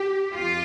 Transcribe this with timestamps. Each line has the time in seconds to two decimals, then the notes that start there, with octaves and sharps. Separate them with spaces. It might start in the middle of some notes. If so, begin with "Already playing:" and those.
Already playing: G4
0.34 F2 F4